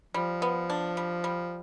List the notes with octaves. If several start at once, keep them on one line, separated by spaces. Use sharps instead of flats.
F3 G3
B3
D4
G3
G3